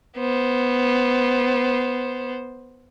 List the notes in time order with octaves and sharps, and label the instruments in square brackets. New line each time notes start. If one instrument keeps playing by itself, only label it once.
[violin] B3 C5